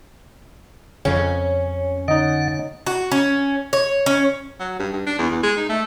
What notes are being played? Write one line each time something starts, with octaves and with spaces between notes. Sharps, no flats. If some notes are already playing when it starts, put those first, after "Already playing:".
F2 C#3 C#4
D3 D#4 D#5 F#5
F#4
C#4
C#5
C#4
F#3
G2
G2
D4
E2
E2
G#3
D#4
A3